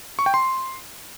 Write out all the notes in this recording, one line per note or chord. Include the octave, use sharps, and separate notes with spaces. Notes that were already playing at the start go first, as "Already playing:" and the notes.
C#6
G5
C6